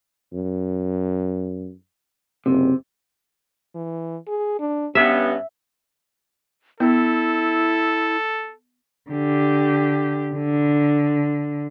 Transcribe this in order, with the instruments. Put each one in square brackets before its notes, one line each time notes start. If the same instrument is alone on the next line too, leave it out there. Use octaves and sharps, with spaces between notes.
[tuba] F#2
[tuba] F#1 [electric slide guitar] C3
[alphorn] E3
G#4
D4
[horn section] G2 B3 [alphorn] C#4 [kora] E5
[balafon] B3 [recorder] E4 [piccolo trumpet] A4
[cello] D3 G4
D3